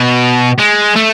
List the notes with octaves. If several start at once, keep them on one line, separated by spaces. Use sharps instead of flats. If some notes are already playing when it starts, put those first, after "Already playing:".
Already playing: B2
G#3
A3